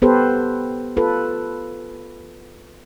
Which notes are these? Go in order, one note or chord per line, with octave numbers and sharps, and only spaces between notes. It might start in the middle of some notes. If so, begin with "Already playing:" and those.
B3 G4 A4 B4 C5
F4 A4 B4